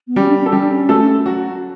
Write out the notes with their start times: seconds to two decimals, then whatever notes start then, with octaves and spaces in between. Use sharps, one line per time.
0.08 B3
0.16 G3 C#4 G4
0.29 D4
0.41 C#4
0.46 A4
0.52 G3 C#4 G4
0.62 D4
0.71 C#4
0.89 A3 A4
1.25 F#3 F#4